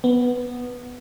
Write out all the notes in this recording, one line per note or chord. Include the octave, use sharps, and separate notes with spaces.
B3